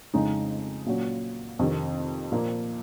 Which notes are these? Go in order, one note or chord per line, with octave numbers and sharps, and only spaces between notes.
F2 C#3 G#3 D#4
A#2 F#3 C#4
F2 C3 D#3
A#2 F3 A#3